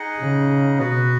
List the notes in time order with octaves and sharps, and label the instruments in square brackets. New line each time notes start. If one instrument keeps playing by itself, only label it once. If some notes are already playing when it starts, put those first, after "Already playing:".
Already playing: [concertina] D#4 G#4 D#5 F#5
[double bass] C#3
[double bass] B2 [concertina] B3 F#4 B4